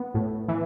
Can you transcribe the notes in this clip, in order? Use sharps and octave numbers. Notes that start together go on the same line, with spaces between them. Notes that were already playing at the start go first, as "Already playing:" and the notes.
Already playing: B3
A2
E3